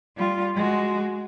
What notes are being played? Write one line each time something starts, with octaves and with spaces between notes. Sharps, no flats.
G3 F4
G#3 F#4